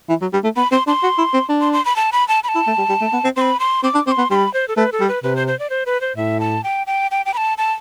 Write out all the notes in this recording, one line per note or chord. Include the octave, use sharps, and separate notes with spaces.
E3
F#3
G3
A3
B3 B5
C4 C6
D4 C6
F#4
E4
C4
D4
C6
C6
B5
A5
B5
A5
B5
A5
E4
A3
G3
G3
A3
B3
C4
C4 B5 C6
C6
C4 D6
D4
C4 D6
C6
B3
G3 B5 C6
C5
A4
A3 B4
A4
G3
B4
C3 B4
C5
C5
D5
C5
B4
C5
A2 E5
A5
G5
G5
G5
G5
B5
A5
A5